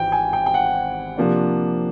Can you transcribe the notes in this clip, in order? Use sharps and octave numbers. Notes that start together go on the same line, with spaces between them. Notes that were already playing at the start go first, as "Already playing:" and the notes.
Already playing: G#1 E3 G5
G#5
G5
G5
F#5
C3 F3 A#3 D4